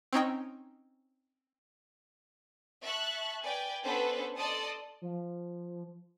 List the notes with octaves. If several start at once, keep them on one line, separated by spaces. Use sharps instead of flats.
C4 C#4 D#4 G5
E5 A5 C#6 F#6
B4 D5 G5 G#5
B3 C#4 D4 A4 B4 C5
A4 D5 D#5 A5 C6 D#6
F3